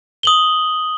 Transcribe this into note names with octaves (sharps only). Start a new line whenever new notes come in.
D#6 F#7 G7